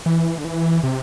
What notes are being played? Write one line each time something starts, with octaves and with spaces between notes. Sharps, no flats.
E3
D3
E3
C3